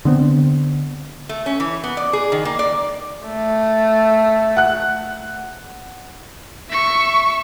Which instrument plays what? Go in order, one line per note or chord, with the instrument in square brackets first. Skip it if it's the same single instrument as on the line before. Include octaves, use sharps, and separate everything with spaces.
[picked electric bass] D3 B3 C4
[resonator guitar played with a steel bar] A3
C#4
E3
B3
D5
G#4
D#3
A#3
D5
[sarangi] A3
[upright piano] F#5 F#6
[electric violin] E5 C#6